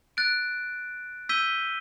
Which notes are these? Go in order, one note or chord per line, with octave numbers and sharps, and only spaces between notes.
F#6 A6 D7
E6 G6 B6 D#7 G7